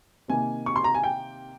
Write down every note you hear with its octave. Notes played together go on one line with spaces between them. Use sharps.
C3 D#3 A#3 G#5
C#6
C6
A#5
G#5
G5